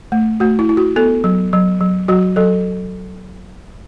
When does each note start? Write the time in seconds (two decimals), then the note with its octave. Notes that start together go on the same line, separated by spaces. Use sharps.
0.12 A3
0.40 A3 F#4
0.59 E4
0.69 E4
0.77 F#4
0.96 B3 A4
1.24 F#3
1.53 F#3
1.80 F#3
2.08 F#3 F#4
2.36 F#3 A4